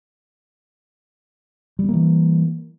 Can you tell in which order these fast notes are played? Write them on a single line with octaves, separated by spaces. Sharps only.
G3 B3 A#3 E3